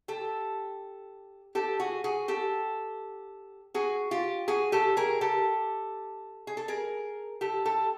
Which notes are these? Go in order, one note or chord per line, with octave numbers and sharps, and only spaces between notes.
G4 A4
G4 A4
F#4 G#4
F#4 G#4
G4 A4
F#4 G#4
F4 G4
F#4 G#4
G4 A4
G#4 A#4
G4 A4
G#4
A4
G#4 A#4
G4 A4
G4 A4